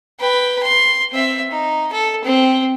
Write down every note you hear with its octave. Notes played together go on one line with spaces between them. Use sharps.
B4 G5
C6
C4 E5
D#4
A4
C4